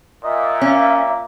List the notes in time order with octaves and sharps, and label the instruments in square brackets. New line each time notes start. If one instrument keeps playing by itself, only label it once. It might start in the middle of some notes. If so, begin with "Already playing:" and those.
[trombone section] A#2 [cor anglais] D#5 [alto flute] E5
[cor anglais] A#3 [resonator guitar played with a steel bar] C#4